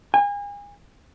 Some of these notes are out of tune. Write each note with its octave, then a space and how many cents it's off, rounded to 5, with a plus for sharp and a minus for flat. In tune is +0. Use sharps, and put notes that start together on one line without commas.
G#5 -35